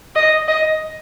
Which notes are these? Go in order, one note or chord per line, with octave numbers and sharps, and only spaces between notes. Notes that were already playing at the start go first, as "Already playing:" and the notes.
D#5
D#5